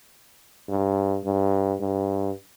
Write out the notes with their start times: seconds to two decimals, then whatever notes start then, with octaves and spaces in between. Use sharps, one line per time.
0.68 G2
1.24 G2
1.81 G2